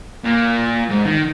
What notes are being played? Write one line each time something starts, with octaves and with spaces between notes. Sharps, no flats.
A#2
G#2
D#3